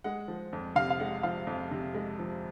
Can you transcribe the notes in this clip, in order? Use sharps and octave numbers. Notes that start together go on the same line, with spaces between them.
G#3 F#5
F3
F2
C3 F5
F5
G#3 F#5
F3 F5
F2
C3
G#3
F3